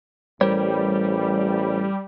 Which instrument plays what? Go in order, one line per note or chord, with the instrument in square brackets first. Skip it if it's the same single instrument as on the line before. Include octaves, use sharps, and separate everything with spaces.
[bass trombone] A1 [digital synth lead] G3 [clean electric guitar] A#4 C5 C#5